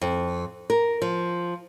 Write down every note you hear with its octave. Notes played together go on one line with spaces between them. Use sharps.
F2
A#4
F3